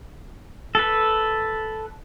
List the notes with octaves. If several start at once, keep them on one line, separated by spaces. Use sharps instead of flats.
A4 B4